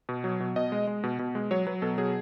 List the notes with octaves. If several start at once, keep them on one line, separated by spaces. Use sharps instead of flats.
B2
F#3
B2
B2 D#5
G#3
G#3
B2
B2
G#3
F#3 C#5
F#3 B4
B2 A4
F#3 G#4